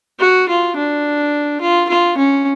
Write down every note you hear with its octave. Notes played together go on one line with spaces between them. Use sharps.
F#4
F4
D4
F4
F4
C#4